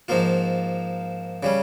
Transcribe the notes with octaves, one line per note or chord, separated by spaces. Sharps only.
G#2 F3 A#3 F4
C#3 G3 C#4